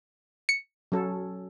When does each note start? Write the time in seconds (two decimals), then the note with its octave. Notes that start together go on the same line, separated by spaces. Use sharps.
0.49 C#7
0.92 F#3 C#4 A4